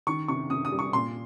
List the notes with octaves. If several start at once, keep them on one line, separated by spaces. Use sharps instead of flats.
D#3 C#6
C3 C#6
C3 D#6
D#6
G3
C#6
A#2 C6